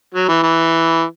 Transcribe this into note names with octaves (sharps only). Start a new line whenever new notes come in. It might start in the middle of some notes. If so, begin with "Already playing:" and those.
F#3
E3
E3